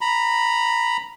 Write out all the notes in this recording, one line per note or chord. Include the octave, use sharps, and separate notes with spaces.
A#5 B5